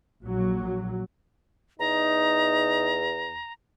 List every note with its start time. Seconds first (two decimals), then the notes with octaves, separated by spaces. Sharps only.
0.24 A#1 F#3
1.79 E2 D#4 A#5